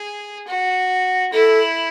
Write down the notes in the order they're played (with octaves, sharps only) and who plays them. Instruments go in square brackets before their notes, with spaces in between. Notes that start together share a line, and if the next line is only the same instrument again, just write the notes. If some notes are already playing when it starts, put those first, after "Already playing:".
Already playing: [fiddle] G#4
F#4
[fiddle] E4 [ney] A4